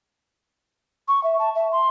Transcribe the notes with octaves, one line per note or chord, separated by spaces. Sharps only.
C#6
E5
A5
E5
C6